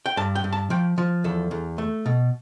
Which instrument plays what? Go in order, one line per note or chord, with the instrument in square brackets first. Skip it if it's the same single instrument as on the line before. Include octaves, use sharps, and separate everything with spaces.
[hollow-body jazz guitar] G5
G2 A5
G5
G2
A5
F3 G5
F3
E2 A4
E2
A3
B2